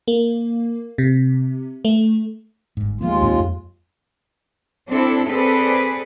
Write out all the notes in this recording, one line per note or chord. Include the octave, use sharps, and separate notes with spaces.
A#3
C3
A3
G1 G#2
D#2 F3 G#3 A#3 B3 F4
C#2 A2 C4
F2
C4 D4 E4 A4
C4 G#4 A4 B4 D5